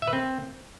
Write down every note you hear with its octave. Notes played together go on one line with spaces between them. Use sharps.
E5
B4
C4